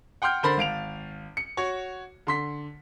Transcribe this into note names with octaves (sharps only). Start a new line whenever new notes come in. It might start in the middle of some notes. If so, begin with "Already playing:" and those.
F#5 G5 C6 F6 G6
D3 A#4 C5 B5 A6
G#1 F5 D7 F7
C#7
F#4 C#5
D3 C6 B6